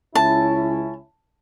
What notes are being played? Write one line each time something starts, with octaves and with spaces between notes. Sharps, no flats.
C#2 C#4 E4 A5